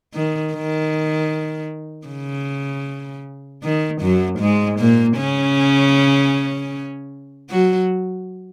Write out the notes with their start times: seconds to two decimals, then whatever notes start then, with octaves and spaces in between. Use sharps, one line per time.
0.14 D#3
0.53 D#3
2.08 C#3
3.63 D#3
4.01 F#2 F#3
4.39 G#2 G#3
4.79 A#2 A#3
5.17 C#3 C#4
7.50 F#3 F#4